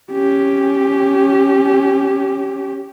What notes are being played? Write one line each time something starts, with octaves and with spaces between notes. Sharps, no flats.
C#4 G4